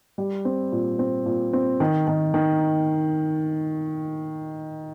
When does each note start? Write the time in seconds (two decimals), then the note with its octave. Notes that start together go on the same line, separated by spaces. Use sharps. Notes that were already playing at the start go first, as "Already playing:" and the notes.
0.18 G3
0.45 C4
0.72 A#2
0.99 C4
1.26 A#2
1.53 C4
1.80 D#3
2.07 D#3
2.34 D#3